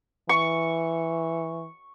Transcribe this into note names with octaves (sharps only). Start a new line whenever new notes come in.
E3 C#6